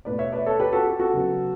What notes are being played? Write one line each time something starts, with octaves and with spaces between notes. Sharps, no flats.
B2 A3 B4 D5
C#5 E5
B4 D5
A4 C#5
G4 B4
F#4 A4
G4
F#4 A4
C#3 F#3 B3